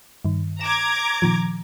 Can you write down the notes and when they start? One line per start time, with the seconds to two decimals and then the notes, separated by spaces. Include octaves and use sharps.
0.25 G2 D#3
0.61 A#5 D6 G#6 E7
1.22 A#2 D#3 F3